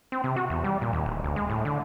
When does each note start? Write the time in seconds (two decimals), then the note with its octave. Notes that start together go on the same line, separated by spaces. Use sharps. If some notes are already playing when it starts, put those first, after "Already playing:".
0.12 C4
0.24 C3
0.36 F#4
0.50 E2
0.64 G3
0.81 A#2
0.93 D#2
1.06 D1
1.24 D2
1.36 G#3
1.50 A2
1.65 D3